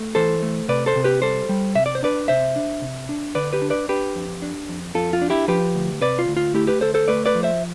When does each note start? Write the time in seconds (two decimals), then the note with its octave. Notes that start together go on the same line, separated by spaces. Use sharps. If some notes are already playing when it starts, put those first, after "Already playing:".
Already playing: A3
0.15 E3 A4 C5
0.42 A3
0.68 C3 B4 D5
0.86 A4 C5
0.96 C3
1.04 G4 B4
1.22 G3 A4 C5
1.49 G3
1.75 C3 E5
1.86 D5
1.95 C5
2.03 D4 B4 D5
2.28 C3 C5 E5
2.56 D4
2.82 C3
3.09 D4
3.35 D3 B4 D5
3.53 G4 B4
3.62 D4
3.70 B4 D5
3.89 D4 G4 B4
4.15 F2
4.42 D4
4.69 F2
4.95 F2 F4 A4
5.13 F4
5.22 D4
5.30 E4 G4
5.48 F3 G4 B4
5.75 D2
6.01 C3 B4 D5
6.19 F4
6.28 D2
6.37 F4
6.54 A3 E4 G4
6.67 G4 B4
6.81 D2 A4 C5
6.94 A4 C5
7.08 A3 B4 D5
7.26 B4 D5
7.35 F3
7.43 C5 E5